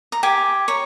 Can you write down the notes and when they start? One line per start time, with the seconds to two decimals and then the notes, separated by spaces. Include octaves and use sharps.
0.12 A#5
0.23 G4 G#5
0.68 C#5 A#5